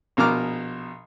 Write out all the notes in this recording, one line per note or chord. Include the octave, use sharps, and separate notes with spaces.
A#1 B2 A#4 A#5 D6 F6